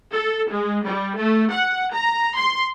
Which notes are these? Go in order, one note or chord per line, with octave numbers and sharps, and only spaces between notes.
A4
G#3
G3
A3
F#5
A#5
C6